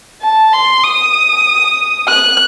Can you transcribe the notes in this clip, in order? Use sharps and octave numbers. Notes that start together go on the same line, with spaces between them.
A5
C6
D#6
F#6